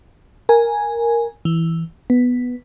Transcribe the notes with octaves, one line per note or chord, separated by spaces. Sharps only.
A#4 G#5
E3
B3